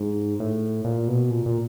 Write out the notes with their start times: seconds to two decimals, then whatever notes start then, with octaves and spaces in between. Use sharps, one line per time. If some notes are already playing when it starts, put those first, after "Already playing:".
Already playing: G#2
0.40 A2
0.85 A#2
1.08 B2
1.31 A#2
1.46 A#2